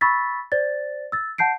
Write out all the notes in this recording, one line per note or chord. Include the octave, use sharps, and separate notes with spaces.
B5 C#6 E6 A6 B6
C5 D5 A6
E6 A6
F#5 A5 G6 C7 D7